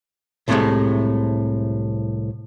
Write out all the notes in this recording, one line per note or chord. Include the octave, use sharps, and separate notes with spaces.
C2 A2 C3 D#3 G#3 A3